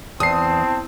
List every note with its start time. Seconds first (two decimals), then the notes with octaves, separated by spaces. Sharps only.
0.20 E2 C4 A5 D#6 C7